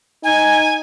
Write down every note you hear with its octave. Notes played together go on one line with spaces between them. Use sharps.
D#4 G#5